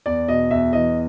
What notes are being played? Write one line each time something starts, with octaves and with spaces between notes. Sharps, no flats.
E2 D5
B2 D#5
E2 E5
E3 D#5